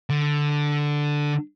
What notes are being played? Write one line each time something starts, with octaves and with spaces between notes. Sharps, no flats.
D3